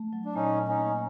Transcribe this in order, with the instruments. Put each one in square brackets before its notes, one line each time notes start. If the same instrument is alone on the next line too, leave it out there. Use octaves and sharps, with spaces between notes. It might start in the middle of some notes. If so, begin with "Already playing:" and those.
Already playing: [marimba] A3
F#3
[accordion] D4
[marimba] A#2 [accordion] C#4 D#4
[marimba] A#2
[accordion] C#4 D#4
[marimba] A#3